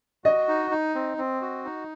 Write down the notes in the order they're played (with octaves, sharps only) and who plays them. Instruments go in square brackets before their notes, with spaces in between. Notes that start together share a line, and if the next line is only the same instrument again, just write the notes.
[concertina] F#4 [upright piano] D#5
[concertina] D#4
D#4
C4
C4
F#4
D#4